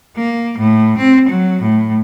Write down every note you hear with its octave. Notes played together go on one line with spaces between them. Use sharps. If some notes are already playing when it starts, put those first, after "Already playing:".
A#3
A2
C4
F#3
A2